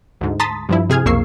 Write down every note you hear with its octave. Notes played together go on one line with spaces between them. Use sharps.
D2 G#2
A5 A#5 C6 D#6 A6 B6
G2 F3 E4
C3 G#4 F6 G#6
B1 F2 A#3 C#6 E6 C7